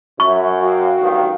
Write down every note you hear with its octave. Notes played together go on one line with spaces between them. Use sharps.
F#2 E5 C#6
F#4 F5 G5
A1 G2 D#3